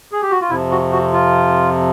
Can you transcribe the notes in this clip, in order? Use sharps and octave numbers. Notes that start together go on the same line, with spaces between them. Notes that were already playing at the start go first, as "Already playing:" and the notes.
G#4
G4
F#4
F4
F2 C3 F3 E4
F#4
F#4
F4